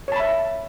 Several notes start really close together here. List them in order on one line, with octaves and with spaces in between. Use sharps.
C#5 A5 B5 E5